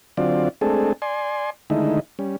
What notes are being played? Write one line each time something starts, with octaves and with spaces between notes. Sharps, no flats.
D3 F#3 C4 F4 D5
G#3 A3 C4 D4 G#4 A4
D5 G#5 C6
D3 D#3 G#3 A3 D#4 E4
G3 C#4